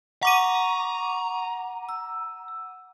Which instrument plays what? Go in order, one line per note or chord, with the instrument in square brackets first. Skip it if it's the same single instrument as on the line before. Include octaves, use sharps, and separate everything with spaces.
[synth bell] F#5 D6 D#7 [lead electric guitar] A#5 [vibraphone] C#6
[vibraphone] E6